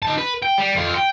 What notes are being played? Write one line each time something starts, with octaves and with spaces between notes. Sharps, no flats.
D#4 A5
B4
G5
G3
F2 F4
G5